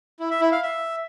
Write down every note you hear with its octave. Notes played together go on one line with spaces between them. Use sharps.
E4
E5
E4
F5
E5